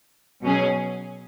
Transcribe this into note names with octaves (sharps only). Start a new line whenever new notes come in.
B2 F#3 C#4 G#4